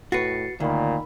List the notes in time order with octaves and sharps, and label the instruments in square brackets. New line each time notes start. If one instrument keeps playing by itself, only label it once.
[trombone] A2 [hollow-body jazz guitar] F#4 B4 [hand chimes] A6 C7 C#7
[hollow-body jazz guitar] D2 [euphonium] A#2 [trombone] D#3 [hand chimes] A#4 B5